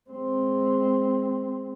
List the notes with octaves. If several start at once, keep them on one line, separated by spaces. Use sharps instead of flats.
G#3 C4